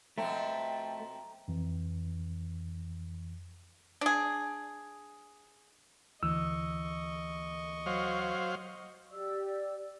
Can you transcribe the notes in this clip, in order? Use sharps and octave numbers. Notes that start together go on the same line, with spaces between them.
B2 F3 A3 C4 G5 A#5
F2 E3
D4 G#4
D2 E3 D#5 C#6 E6
F#3 C5 F5
G4 D5 E6